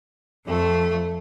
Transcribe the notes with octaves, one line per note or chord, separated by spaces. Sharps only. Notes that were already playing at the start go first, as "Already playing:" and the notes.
F2 A3